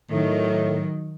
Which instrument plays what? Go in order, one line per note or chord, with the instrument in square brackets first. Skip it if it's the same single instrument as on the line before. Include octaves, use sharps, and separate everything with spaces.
[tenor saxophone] A2 [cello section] D#3 F#3